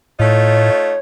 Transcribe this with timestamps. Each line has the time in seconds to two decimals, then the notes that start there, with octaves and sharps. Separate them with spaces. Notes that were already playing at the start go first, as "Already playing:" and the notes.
0.20 A2 A3 D#4 F4 C#5